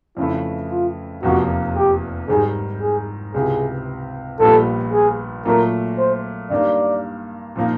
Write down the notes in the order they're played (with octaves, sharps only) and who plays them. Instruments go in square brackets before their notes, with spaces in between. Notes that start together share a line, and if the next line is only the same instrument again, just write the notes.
[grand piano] F2 C#3 E3 A3 [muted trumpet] E4
[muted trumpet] F4
[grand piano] F1 E2 C3 F3 A#3 [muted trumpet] F#4
[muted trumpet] G4
[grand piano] G#2 D#3 G3 [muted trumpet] G#4
[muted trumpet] G#4
[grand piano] C#2 C3 E3 [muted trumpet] G#4
[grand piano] A#1 A#2 G3 B3 [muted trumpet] A4
[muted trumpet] G#4
[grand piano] A#2 F#3 A3 [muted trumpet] A#4
[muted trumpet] C5
[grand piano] G2 D#3 G3 A#3 [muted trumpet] D5
[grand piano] A#2 F3 A#3 D#4